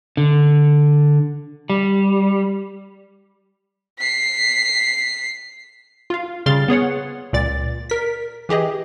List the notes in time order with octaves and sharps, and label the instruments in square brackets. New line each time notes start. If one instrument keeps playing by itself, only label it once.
[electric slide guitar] D3
G3
[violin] B6 C7
[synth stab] F4 F5
C#3 G3 C6 F6 A6
B3 G#4 C#5 F#5
C#2 A#2 D5 A6
A#4 B6
E3 G4 G#4 D#5